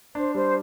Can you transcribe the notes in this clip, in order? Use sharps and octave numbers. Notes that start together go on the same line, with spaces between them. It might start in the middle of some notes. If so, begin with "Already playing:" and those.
D4 C5
G3 C5